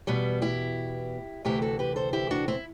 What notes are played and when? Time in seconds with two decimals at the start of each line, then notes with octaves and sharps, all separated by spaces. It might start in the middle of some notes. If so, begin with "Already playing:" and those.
0.07 E2 B2 G3 B3
0.42 E4 G4
1.45 D2 C3 E3 E4 G4
1.62 F#4 A4
1.79 G4 B4
1.96 A4 C5
2.13 E4 G4
2.31 D4 F#4
2.48 C4 E4